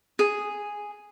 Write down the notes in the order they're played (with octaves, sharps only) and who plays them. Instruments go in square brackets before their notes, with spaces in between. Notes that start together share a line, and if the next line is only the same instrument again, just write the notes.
[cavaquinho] G#4